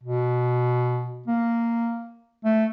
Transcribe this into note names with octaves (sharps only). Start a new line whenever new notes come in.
B2
A#3
A3